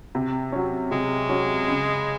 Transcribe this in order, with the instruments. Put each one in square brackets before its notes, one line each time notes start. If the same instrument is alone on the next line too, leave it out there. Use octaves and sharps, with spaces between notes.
[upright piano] C3
F#3 C#4
[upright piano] C3 [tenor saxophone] G#3
[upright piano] F#3 C#4
C#3